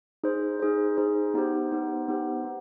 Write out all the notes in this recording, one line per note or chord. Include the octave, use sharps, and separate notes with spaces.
D#4 G#4 C5
D#4 G#4 C5
D#4 G#4 C5
B3 D#4 G4 C5
B3 D#4 G4 C5
B3 D#4 G4 C5
B3